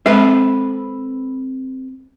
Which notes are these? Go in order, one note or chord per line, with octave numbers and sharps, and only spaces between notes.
G#3 C4 A4 B4 E5